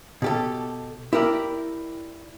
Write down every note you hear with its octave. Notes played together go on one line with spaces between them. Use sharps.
B2 G4 A4
E4 G4 A#4 D5